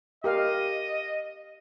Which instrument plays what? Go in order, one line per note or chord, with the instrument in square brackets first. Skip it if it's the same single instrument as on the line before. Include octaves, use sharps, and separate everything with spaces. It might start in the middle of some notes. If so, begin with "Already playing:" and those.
[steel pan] G4 A#4 F5 [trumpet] D#5